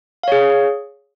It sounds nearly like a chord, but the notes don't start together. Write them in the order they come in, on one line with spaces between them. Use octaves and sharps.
F5 C#5 G#4